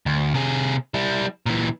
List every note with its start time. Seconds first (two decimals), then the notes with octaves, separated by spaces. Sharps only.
0.06 D2
0.34 C3 G#4
0.94 G3 E4
1.46 A#2 E3